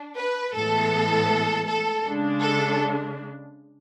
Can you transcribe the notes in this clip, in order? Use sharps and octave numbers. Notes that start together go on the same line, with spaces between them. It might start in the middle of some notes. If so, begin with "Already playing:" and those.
Already playing: D4
B4
A2 E3 G#3 B3 A4
A4
C#3 G#3 D4
A4